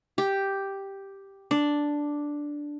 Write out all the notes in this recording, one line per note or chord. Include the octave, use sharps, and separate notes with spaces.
G4
D4